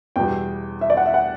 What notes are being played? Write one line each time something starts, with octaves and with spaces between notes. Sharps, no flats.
E2 B2 G3 G5
E5
D5
F#5
E5
F#5